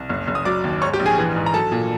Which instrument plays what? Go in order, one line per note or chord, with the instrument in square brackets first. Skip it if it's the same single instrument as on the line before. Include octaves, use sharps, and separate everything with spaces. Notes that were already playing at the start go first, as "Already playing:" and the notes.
Already playing: [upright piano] C2
F#1
F#1
D#6
F#3 D5 D6
D#2
G#2 C#5 C#6
G4 G5
A#1
G#4 G#5
E3
G#2
A#5
F#3 A4 A5
A#2